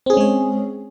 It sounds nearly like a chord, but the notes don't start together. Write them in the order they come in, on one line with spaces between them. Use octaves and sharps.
C4 G#4 C#4 G#3 C#5